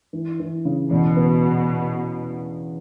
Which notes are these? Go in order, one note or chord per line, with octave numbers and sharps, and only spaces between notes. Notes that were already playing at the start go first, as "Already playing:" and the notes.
E3
E3
C#3
E2 B2
B3